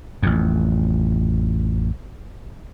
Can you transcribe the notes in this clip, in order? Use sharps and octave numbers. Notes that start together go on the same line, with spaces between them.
A1 F2